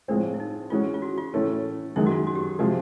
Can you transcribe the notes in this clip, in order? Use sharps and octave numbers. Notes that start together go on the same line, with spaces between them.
A2 F3 G#3 C4 D4
E4
D#4
E3 G#3 C#4 F4 F#4
F4
F#4
F4
A2 E3 A3 C#4
F#2 D#3 G#3 E4
F#4
F4
F#4
G4
F#4
C3 F3 G#3 F#4